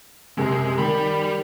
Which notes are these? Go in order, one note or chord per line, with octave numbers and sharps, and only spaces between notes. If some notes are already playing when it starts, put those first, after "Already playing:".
F#2 C3 G#3
D#3 G3 B5